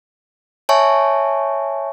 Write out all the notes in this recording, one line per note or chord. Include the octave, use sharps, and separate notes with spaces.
C#5 E5 G#5 A5 C#6